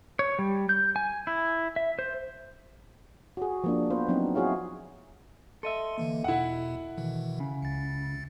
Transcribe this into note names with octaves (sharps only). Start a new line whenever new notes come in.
C#5
G3
G6
G#5
E4
E5
C5
F#4 G#4
F3 A#3 D4
B3 F4 B4 C5
F3 F#3 C4 D4 D#4
E4 F#4 G#4 C#5 F5
A4 D#5 E5 C6
D3 E3 A#3
E2 B2 E4 F#5
B2 D#3 E3
C#3
C#2 A6